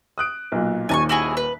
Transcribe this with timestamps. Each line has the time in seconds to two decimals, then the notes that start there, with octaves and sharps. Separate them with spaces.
0.18 D#6 F#6 D7
0.52 B1 A#2
0.89 D#1 D#2 G#5 A5 C#6
1.09 E4 F#4 G#4
1.37 B4